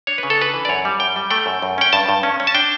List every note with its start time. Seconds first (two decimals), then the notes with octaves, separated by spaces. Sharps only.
0.07 D4 C#5
0.18 B4
0.23 C#3
0.30 A4
0.38 D4 B4
0.54 E3
0.65 D5
0.69 F#2 C#5
0.85 G3
1.00 F#2 G5
1.16 G3
1.31 A3 G5
1.46 F#2
1.62 F#2
1.78 C#4 G5
1.93 G2 A5
2.09 G2
2.23 C#4
2.40 C#4
2.47 A5
2.55 D4 G5